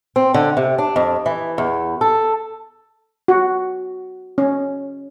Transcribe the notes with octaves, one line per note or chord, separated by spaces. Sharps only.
C4
D3
C3
D4
F2
E3
E2
A4
F#4
C#4